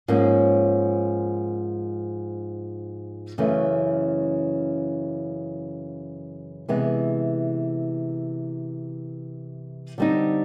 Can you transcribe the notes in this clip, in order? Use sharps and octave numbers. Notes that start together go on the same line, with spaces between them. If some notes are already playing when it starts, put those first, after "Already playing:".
G#2 F3 A#3 C#4
F#2 C#3 E3 A3
C3 E3 G#3 B3
D3 G3 C4 D#4